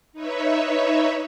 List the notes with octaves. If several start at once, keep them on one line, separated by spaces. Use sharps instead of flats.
D#4 B4 C#5 E5